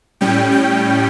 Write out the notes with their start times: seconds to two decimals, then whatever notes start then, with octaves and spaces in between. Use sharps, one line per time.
0.21 A2 G3 C#4 G5
0.52 G5